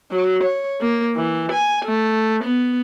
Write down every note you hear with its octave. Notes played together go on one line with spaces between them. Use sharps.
F#3
C#5
A#3
E3
G#5
A3
B3